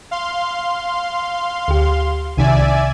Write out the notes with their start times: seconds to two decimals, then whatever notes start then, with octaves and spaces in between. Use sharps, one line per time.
0.11 F5 C6
1.68 D2 G4
2.37 C2 C3 D#3 D5 E5 G#5